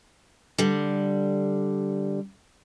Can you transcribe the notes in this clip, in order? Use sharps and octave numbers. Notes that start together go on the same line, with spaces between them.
D3 G3